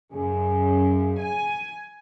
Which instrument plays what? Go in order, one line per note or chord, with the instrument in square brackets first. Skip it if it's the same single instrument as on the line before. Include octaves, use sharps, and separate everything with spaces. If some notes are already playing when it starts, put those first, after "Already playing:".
[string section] F#2 [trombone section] C#3 G#4
[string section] G#5